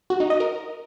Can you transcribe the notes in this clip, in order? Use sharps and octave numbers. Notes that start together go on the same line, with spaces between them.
F#4
D#4
D#5
A#4